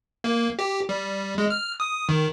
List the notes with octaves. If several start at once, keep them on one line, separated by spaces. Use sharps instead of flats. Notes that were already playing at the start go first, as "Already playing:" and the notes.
A#3
G4
G3
G#3
F6
D#6
D#3